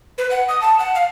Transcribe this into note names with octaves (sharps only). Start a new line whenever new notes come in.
B4
F#5
D#6
A5
F#5
F5